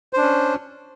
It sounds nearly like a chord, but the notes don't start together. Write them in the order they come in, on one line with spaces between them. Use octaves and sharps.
C5 D4 C#4